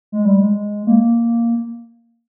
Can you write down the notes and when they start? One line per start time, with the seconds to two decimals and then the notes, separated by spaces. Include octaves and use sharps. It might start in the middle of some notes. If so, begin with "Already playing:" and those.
0.12 G#3
0.25 G3
0.39 G#3
0.87 A#3